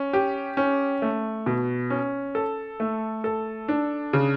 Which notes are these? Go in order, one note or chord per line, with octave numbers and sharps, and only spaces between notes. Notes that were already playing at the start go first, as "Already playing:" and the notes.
Already playing: C#4
G4
C#4
A3
B2
C#4
A4
A3
A4
D4
C#3